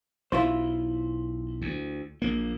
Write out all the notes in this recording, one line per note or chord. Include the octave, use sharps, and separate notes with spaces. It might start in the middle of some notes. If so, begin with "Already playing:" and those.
B1 E4 F4 C5
D2
A#1 A#3